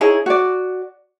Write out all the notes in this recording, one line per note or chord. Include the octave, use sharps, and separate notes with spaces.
D#4 E4 G#4 C#5
F#4 D5